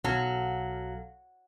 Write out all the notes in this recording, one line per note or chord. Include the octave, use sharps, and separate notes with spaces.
B1 F#3 A4 F5